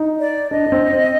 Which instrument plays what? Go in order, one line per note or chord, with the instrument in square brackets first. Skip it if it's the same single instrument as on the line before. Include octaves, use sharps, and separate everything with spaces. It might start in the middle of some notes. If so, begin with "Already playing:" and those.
Already playing: [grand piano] D#4
[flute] D5
[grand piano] D4 [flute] D#5
[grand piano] D4
C4
C4